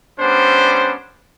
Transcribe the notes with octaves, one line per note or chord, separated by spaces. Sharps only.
G3 B3 C#4 D4 C5